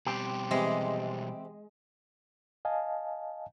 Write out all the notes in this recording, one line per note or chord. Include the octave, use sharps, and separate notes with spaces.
B2 G3 C4 G4
C3 E3 G#3
D#5 F5 G#5 A5